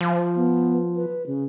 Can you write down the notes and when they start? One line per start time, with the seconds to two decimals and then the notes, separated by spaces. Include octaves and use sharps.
0.01 F3
0.36 B3
0.96 B4
1.26 C#3